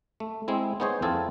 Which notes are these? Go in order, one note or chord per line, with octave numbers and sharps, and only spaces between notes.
A3
G#3 C4 E4
B3 D#4 G#4 C5 C#5
F2 C4 E4 F4 A4 G#5